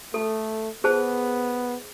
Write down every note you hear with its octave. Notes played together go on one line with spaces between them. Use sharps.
A3 A4
B3 G#4 C5 A5